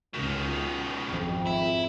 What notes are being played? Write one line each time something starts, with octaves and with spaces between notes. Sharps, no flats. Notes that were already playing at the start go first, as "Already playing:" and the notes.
C#2 B2 D#3
G#1 F2
E4